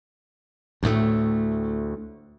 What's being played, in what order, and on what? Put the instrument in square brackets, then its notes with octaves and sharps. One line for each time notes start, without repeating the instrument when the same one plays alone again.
[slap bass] D2 A2 A3